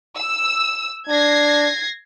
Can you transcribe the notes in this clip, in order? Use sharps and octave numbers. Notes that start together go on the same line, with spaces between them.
E6
D4 G#6 A#6 C7